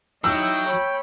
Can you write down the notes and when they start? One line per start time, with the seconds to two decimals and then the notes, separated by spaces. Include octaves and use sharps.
0.24 F#3 D#4 E4 G5 E6
0.67 C#5 B5